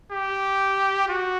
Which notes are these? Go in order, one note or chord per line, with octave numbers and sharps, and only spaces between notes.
G4
F#4